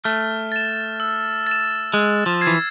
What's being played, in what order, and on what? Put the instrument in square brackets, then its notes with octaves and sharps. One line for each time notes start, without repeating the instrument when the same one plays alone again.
[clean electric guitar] A3 [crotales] F6
[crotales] A6 E7
E6
A6 E7
[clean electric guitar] G#3 [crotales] E6
[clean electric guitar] F3
[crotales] G#6 C7
[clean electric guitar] E3